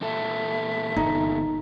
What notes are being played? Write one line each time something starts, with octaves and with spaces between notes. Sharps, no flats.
E2 A#2 A4 E5
G1 D#4